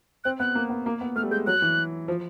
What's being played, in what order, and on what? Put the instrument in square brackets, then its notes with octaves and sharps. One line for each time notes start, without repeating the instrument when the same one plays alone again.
[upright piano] C4 [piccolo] F#6
[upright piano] B3 [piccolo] F#6
[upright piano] A#3
B3
A#3
B3
[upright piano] A3 [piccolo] F6
[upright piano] G3
[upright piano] G#3 [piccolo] G6
[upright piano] F#3 [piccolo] F#6
[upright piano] E3
F3